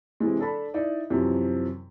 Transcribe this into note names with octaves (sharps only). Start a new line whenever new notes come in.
C3 E3 G#3
D4 A4 A5 B5
D#4 E4 D5
F#2 C3 E3 F3